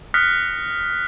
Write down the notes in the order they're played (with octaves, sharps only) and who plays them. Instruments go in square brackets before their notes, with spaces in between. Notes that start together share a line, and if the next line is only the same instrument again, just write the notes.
[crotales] D#6 F6 F#6 A#6 B6 C#7